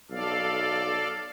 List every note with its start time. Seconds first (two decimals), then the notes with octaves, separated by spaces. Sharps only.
0.11 B1 A4 D5 F5